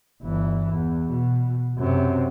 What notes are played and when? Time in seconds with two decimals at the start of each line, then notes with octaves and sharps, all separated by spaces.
0.22 G1 E3
0.72 E2
1.10 B2
1.78 F#2 C3